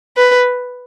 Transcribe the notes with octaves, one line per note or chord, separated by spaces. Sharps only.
B4